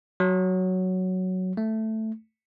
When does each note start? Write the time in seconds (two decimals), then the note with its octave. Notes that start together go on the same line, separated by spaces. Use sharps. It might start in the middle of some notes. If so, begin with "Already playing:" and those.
0.20 F#3
1.57 A3